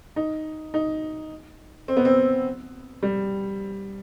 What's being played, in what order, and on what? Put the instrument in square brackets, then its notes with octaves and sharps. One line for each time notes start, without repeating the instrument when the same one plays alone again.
[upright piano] D#4
D#4
C4
B3
C4
G3